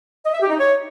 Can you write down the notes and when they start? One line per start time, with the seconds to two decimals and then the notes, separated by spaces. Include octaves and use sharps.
0.25 D#5
0.33 E5
0.42 G4
0.50 D#4
0.58 C#5